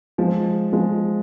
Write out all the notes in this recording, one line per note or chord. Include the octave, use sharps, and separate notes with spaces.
F3 G#3
F3 G#3